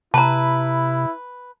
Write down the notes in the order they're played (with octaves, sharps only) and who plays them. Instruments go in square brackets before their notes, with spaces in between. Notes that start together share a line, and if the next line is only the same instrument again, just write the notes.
[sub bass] C3 [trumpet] E4 [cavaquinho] B4 [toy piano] A5 A#5